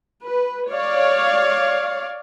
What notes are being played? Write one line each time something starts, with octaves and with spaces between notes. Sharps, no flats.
B4
C#5 D5 F5